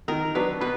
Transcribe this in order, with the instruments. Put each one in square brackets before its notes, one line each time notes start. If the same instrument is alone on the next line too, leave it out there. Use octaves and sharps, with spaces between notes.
[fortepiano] D#3 [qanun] A#4
[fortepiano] F#3 B3 D4 [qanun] B4
[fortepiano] B2 [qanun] B4